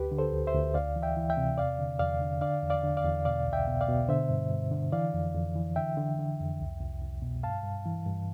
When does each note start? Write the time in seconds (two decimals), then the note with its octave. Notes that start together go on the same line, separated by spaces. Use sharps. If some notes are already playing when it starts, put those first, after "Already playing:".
Already playing: D2 G4 B4
0.12 D3
0.18 A4 C5
0.33 D2
0.47 C5 E5
0.54 D2
0.74 D2 D5 F5
0.96 E3
1.03 E5 G5
1.17 E3
1.30 E5 G5
1.37 C3
1.58 E2 D5 F5
1.79 D3
1.99 E2 D5 F5
2.21 D3
2.41 D3 D5 F5
2.63 E2
2.70 D5 F5
2.83 D3
2.97 D5 F5
3.04 E2
3.25 B2 D5 F5
3.46 C2
3.53 E5 G5
3.67 B2
3.81 D5 F5
3.89 B2
4.09 D3 C5 E5
4.30 G2
4.51 G2
4.71 D3
4.92 E3 D5 F5
5.14 F2
5.34 F2
5.56 E3
5.76 D3 E5 G5
5.97 D3
6.19 D3
6.40 F2
6.60 C2
6.81 C2
7.01 C2
7.22 B2
7.43 G2 F5 A5
7.64 G2
7.85 E3
8.06 G2